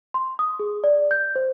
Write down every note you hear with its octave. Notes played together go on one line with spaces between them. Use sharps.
C6
D#6
G#4
D5
G6
C5